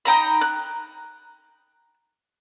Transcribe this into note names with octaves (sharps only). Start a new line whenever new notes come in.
D#4 G5 A#5 B5
F#6